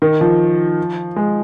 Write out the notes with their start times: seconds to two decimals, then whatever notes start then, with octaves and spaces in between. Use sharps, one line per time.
0.02 D#3
0.21 F3
1.16 G#3